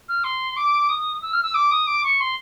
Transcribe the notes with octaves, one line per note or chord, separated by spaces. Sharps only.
F6
C6
D6
D#6
E6
F6
E6
D6
D#6
D6
C#6
C6